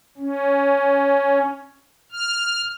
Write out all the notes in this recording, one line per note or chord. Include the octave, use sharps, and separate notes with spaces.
C#4
F6